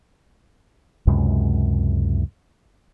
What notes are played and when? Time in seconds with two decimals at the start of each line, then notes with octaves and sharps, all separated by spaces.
1.07 C#2 F#2 C3 G#3